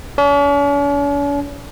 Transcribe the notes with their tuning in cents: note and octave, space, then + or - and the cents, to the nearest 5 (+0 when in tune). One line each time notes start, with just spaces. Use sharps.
C#4 +45